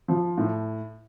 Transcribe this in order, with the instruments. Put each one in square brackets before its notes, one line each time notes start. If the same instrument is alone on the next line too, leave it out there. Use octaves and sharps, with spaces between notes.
[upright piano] F3
A2